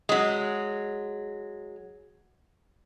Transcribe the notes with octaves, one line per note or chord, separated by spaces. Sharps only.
F#3 G#3